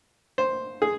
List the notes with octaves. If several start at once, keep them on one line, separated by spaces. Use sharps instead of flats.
C5
G#4